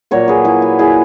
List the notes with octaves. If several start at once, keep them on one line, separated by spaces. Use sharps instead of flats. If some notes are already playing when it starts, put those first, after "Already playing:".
A#2 F#3 A#3 A#4 C#5
G#4 B4
E4 G#4
F#4
E4 G#4